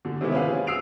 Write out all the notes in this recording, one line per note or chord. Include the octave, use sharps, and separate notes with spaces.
A#2 D3
C3 D#3 G#3 A#3 B3 E4
C#4 F4 B4 F5
F3 G#4
D#6 E6 C7 D7 F7